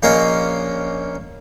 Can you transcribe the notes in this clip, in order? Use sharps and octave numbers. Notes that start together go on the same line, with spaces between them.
A#1 A#3 C#4 A#4 D#5